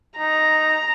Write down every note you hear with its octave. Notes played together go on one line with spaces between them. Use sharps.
D#4 A#5